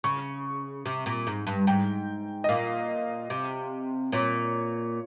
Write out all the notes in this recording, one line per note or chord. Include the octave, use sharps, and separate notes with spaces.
C#3 C#6
C3
A#2
G#2
G2
G#2 G5
D#5
A#2 F5
C3
A#2 C#5